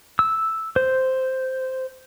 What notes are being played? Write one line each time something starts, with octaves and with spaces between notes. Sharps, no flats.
E6
C5